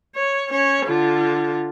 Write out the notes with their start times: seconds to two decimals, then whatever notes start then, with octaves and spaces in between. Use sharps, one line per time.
0.15 C#5
0.49 C#4 C#5
0.86 D3 F4